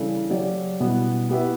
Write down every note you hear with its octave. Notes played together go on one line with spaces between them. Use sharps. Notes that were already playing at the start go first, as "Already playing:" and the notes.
Already playing: C#3 E3 G3 D4 A4
C#3 F#3 C#4 G4 D5
B2 G3 B3 E4
B3 E4 G4 B4 E5